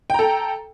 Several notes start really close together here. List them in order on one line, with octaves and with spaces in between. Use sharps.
G5 A#5 A4